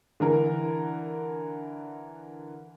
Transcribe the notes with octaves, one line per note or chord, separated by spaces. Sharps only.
D3 E3 A#4